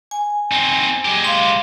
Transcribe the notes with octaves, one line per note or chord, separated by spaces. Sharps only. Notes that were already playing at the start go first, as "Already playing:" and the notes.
G#5
C4 D#4
G#3 G4
F5 C6